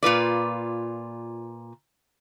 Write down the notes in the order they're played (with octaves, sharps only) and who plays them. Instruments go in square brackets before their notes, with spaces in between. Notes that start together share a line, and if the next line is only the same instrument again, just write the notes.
[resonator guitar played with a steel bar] A#2 F4 B4 D5